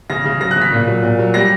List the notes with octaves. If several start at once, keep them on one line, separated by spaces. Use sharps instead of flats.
C#3 A#6
C#3
F#3 A#6
F#6
C#3
B6
A#2
F#3
A#2
F#3
G3 A#6